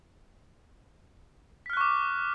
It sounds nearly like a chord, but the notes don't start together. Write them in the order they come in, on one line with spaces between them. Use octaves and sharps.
B6 F6 F#6 C#6 D6